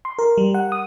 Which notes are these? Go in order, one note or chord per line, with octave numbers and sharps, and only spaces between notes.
C6
A#4
G3
F#5
D#6